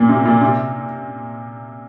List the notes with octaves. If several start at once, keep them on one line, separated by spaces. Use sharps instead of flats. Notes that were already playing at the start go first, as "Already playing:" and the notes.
Already playing: A#2
C3
A#2
C3